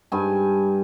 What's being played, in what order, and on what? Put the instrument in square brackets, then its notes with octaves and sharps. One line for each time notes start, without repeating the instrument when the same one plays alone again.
[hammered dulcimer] G2 G#5